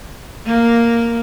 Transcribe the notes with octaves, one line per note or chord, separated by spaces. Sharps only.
A#3